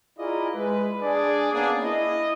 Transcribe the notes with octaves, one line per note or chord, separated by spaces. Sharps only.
E4 F4 G#4 A#4 D5 D#5
G#3 B4
D4 G#4 D5
A#3 B3 C#4 D4 G#4
E4 D#5